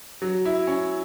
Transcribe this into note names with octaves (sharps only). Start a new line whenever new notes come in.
F#3
E4
C#4